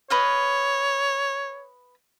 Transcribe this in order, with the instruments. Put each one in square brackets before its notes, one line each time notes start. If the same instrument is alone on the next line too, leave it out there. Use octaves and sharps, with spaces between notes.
[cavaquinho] B4 D#5 F5 [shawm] C#5